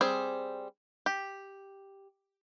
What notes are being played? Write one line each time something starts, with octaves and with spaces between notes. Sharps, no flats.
G3 C4 G#4
G4